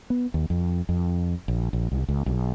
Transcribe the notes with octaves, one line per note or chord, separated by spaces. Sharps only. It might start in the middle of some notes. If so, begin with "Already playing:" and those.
B3
D#2
F2
F2
A#1
A#1
C2
C#2
B1